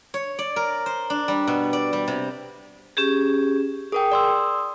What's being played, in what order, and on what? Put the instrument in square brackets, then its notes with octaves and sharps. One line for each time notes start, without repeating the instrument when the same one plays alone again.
[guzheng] C#5
D5
A#4
C5
D4
G3
B2
D5
G3
C3
[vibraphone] C#4 G4 G#4
[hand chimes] G#4 A#4 G5 [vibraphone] D#6
[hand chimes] D5 C6 E6